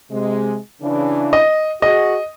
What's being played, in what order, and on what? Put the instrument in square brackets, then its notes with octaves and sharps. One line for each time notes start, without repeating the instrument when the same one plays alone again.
[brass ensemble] C3 G#3
C#3 E3 D4
[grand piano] D#5
[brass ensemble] F#4 G#4 [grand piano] D#5